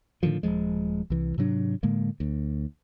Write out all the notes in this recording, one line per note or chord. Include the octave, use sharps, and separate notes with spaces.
A2 D3 D#3 F3
D#1 G#1 F3 G#3
C2 E3
G#2 C3 F#3 D4
A2 D3 G#3 A#3
D2